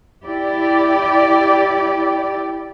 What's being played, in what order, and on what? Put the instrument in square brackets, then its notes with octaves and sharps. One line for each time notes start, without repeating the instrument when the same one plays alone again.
[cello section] E4 G4 D5